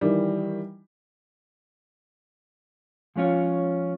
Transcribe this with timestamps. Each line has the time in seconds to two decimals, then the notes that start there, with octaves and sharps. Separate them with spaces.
0.01 D#3 E3 G3
3.16 F3 G#3 C#4 F4 C#5